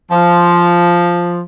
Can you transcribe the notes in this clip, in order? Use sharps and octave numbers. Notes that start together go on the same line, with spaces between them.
F3